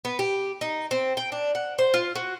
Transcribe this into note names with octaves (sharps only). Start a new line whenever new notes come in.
B3
G4
D#4
C4
G5
D4
F#5
C5
F4
F#4